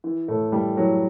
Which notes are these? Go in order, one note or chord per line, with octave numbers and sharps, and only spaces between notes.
E3
A2 A3
E3 G3
E3 F#3